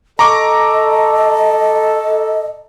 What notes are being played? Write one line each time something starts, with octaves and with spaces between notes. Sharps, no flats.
A4 D#5 A#5 C#6 D6